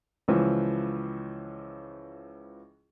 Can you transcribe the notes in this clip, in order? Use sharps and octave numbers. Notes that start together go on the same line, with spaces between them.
C#2 E3 F3